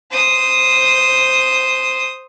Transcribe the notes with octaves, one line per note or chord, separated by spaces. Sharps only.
C5 D#6